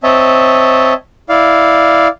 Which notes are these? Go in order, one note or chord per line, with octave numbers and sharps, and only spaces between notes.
C4 C#5 D#5 E5 A5
E4 D5 F5